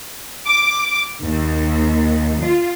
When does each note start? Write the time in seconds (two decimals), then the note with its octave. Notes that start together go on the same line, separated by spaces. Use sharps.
0.47 D6
1.22 D#2
2.43 F4